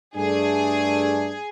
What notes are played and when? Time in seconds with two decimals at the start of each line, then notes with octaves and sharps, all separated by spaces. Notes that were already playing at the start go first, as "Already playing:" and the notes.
0.16 G2 A3 D4 G#4